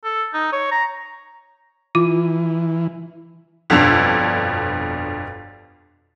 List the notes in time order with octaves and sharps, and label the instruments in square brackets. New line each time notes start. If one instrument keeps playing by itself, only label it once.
[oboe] A4
D#4
C#5
A#5
[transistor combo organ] E3 [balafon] F4
[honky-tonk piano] G1 F2 B2 D4 E6 F7